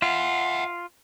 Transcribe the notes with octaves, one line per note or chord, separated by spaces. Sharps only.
F4 E5 F#5